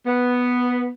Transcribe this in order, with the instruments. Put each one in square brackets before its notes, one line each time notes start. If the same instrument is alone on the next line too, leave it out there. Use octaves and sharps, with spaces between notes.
[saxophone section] B3